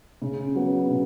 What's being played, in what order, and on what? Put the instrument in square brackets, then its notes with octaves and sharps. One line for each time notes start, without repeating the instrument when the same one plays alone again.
[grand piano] C#3
F#3 B3
C#3